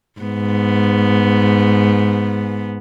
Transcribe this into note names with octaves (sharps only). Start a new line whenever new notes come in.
G#2 B3